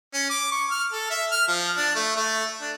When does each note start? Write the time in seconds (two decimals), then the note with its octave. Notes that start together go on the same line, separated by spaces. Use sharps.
0.14 C#4
0.30 D6
0.52 C#6
0.71 F6
0.93 A4
1.11 E5
1.32 F6
1.48 F3
1.77 D4
1.96 A3
2.17 A3
2.61 D4